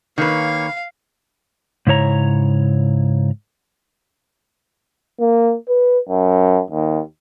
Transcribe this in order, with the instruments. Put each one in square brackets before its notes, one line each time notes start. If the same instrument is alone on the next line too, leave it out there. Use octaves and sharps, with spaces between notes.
[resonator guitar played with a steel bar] D#3 B4 [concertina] A#3 C#5 C#6 [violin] F5
[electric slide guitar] G#2 C#3 E4 C#5 A#5
[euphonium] A#3
B4
F#2
D#2